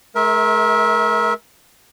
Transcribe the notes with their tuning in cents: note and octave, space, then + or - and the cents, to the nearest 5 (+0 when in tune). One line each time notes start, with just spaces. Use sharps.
A3 -45 A#4 +20 E5 -20